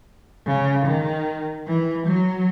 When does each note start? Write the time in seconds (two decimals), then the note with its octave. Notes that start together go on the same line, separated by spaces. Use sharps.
0.47 C#3
0.86 D#3
1.67 E3
2.07 F#3